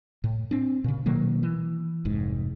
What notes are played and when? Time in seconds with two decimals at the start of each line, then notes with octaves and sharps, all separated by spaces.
0.24 A2
0.51 C4 D4
0.84 A#2 C#3
1.06 B2 D#3 F#3 A#3
1.43 E3
2.05 F1 G#2